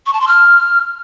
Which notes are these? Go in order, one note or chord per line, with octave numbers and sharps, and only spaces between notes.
C#6
A5
C6
F6